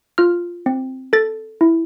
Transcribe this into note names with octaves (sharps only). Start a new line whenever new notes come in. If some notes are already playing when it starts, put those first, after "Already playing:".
F4 F6
C4
A4 A6
E4